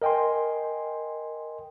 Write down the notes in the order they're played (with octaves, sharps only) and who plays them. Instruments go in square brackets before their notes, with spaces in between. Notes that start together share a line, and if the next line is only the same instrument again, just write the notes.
[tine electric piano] A#4 D#5 G5 G#5 C6